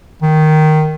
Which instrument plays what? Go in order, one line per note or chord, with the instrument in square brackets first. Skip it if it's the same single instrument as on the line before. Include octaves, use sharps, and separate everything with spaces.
[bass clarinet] D#3